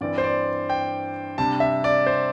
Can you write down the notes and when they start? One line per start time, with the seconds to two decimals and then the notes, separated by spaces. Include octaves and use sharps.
0.01 G2 E3 C4 D5
0.18 C5
0.24 D5
0.70 G5
1.38 C3 G3 D4 A5
1.60 E5
1.84 D5
2.06 C5